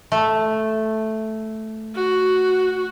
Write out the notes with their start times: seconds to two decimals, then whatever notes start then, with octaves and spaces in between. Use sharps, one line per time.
0.12 A3
1.95 F#4